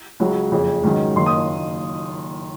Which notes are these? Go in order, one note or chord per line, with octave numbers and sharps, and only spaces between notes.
C#2 C#3 F#3
F#1 F2 C#3
G#2 D#3 F#3 C#4
F#1 F#2 D#3 A#3 C6
D#6